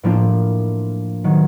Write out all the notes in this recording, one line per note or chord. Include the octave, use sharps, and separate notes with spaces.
A2 F3 A#3 D4 F4
D#3 F#3